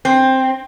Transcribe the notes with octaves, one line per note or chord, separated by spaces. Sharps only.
C4